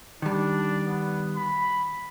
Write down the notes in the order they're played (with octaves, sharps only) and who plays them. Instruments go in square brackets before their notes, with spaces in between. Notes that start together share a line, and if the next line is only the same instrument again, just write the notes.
[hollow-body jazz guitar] D#3 G3 [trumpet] D4
[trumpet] B3
B5